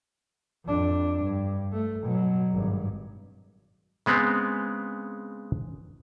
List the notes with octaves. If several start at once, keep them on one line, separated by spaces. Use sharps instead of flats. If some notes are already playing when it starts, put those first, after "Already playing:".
F2 D4
G2
A3
B2 F#3
G#1 G2
C#3 G#3 B3 C4